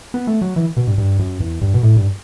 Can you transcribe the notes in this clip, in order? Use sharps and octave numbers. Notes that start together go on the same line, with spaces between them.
B3
A3
F#3
E3
B2
G2
G2
F#2
E2
G2
B2
A2
G2